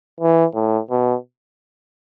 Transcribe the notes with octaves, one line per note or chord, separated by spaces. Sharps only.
E3
A2
B2